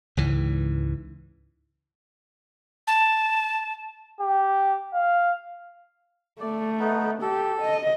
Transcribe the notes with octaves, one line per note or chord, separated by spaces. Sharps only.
C#2 G#2 E3
A5
G4
F5
A3 D5
B3 D#4
G4 A4
D#5